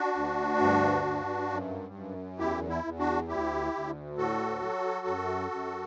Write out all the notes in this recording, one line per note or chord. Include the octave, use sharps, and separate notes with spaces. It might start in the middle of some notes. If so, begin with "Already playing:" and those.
Already playing: D4 F#4
D2
G2
G2
F#2
F#2
E2 E4 G4
E4
E2
D4 F#4
D2 E4 G4
D2
A2 F#4 A4
F#3
F#2
F#2